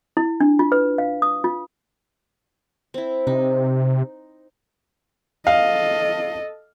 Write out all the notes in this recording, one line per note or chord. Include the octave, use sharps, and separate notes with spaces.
E4
D4
F4
B4
F5
D#6
F4
C4 E4
C3 D#4
A4 D#5 F5